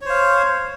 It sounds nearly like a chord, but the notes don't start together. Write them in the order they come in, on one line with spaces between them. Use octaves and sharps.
C#5 C5 F5